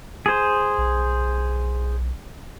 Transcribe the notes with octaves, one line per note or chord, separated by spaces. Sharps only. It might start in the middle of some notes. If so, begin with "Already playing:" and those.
G#4 C5
B1